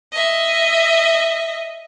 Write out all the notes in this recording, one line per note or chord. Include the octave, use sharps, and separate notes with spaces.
D#5 E5